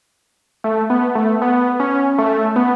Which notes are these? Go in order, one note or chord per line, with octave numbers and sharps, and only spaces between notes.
A3
B3
A3
B3
C#4
A3
B3